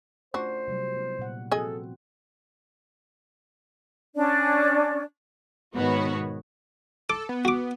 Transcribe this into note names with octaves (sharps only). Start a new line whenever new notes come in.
A3 C#4 D4 F4 F#4 C5
C3 F#3 G3
B3 E4
A#2 F#5
F3 C4 F#4 G#4 A4 D#5 G#5
C#4 D4 D5
G#2 B2 D#3 B3 F#4 C#5
A4 D6
B3
F#4 D6